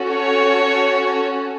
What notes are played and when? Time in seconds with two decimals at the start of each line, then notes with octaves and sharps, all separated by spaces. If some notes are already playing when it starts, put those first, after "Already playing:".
Already playing: C#4 F#4 A4
0.09 C#5